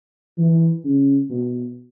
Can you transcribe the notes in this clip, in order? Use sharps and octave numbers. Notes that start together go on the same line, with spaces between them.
E3
C#3
B2